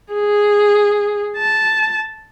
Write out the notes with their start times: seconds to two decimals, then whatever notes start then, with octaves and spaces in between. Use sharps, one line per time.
0.13 G#4
1.37 A5